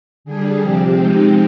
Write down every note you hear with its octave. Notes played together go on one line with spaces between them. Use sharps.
D3 G3 D4 G#4
C3 F3 C4 G4
F3 G#3 C4 D#4